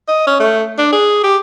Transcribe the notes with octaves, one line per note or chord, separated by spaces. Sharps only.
D#5
C#4
A3
D4
G#4
G4